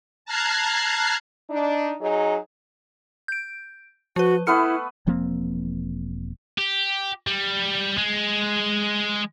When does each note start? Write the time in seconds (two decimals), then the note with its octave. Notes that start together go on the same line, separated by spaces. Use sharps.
0.25 A5 A#5 F6 F#6 G#6 C7
1.50 D4 D#4
2.01 F#3 D#4 G#4
3.28 G6 D7
4.16 F3 F#4 B4
4.47 A3 B3 E4 B4 F6 C#7
5.07 E1 F3 A#3 C4
6.58 G4
7.27 G3
7.98 G#3